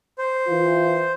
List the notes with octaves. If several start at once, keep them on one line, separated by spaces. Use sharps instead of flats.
C5
E3 F4